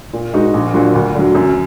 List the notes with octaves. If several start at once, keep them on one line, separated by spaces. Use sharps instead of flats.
A#2
G#3 D#4 F#4
A#1
A#2 F#3 D4 F#4
D2
D3 F#3
F#2